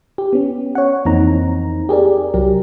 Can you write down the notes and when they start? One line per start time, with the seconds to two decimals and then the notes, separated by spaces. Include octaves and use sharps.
0.18 G4
0.33 B3 C#4
0.75 C#5 F#5
1.05 F2 E3 A#3 C4 D#4 A#5
1.89 G4 G#4 A#4 D5
2.34 C2 F#3 G4 A#4